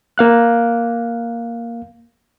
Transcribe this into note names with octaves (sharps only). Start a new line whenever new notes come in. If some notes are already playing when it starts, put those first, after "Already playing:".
A#3 F5 F#6